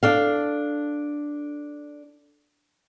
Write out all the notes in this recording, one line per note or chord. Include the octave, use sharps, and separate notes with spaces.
D4 A4 F5